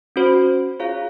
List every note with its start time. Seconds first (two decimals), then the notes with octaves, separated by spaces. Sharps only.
0.16 C#4 F#4 C5
0.80 F4 G#4 C#5 F5